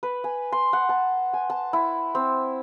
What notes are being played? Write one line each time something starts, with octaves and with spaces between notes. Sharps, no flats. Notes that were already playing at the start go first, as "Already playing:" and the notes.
B4
G#5
C6
F#5
A5
G#5
A5
E4
C4